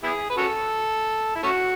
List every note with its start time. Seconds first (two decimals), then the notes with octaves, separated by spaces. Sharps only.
0.03 B3 E4 G#4
0.30 B4
0.37 C#4 F#4 A4
1.36 E4
1.43 A3 C#4 F#4